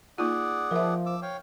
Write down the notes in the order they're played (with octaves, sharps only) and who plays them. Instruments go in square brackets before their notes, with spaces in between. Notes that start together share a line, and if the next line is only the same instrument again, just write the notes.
[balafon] A#3 D#4 F4 [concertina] G#4 D5 F#5
[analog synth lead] F3 [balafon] A#4 E5
[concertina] D6 E6
C#5 F5 G5